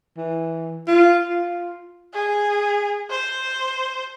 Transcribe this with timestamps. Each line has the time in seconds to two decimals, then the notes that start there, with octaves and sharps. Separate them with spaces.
0.17 E3
0.88 F4
1.29 F4
2.13 G#4
3.10 C5